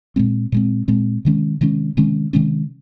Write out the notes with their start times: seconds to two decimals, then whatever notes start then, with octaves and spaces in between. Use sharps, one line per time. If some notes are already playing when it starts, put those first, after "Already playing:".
0.16 A#2 G#3 C4
0.52 A#2 G#3 C4
0.88 A#2 G#3 C4
1.25 C3 D#3 G#3 C#4
1.61 C3 D#3 G#3 C#4
1.97 C3 D#3 G#3 C#4
2.33 C3 D#3 G#3 C#4